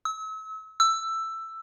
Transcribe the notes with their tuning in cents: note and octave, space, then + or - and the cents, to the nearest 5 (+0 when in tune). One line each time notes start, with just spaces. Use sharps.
E6 -35
E6 +10